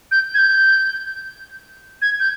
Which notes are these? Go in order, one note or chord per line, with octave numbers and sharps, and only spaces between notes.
G6
G#6
G6
G#6
G6